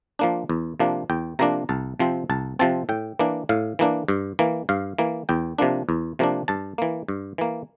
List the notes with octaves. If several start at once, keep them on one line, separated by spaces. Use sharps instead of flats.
F3 A#3 D4
E2
C3 F3 A#3 D4
E2 G5
C3 F3 A#3 D4 A#5
C2 A5
C3 F3 C4
C2 A5
C3 F3 C4 A5
A2 G5
E3 A#3 D4
A2 F5
E3 A#3 D4
G2
E3 A#3
G2 F5
E3 A#3
E2 G5
C3 F3 A#3 D4
E2
C3 F3 A#3 D4
G2 A5
E3 A#3
G2
E3 A#3